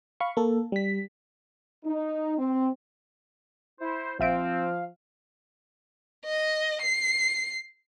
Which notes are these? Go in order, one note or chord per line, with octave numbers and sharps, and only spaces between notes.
F5 B5 C#6
A#3 A4
G3 B6
D#4
C4
E4 C5
A#1 F3 C4 E5 F5 D7
D#5
C7